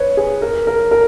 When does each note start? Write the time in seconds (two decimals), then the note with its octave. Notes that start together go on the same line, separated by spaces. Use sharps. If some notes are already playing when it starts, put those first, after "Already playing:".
Already playing: B4 C#5
0.17 G#4
0.42 A#4
0.67 A#4
0.91 A#4